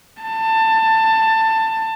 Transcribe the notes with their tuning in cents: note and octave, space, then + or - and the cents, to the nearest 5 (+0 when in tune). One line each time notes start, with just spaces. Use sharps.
A5 +20